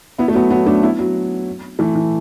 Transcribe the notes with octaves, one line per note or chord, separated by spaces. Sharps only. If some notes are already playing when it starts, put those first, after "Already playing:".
B3 E4
A3
F#3 B3
F#3 B3
A3 D4
B3 E4
F#3
E3 A3
E3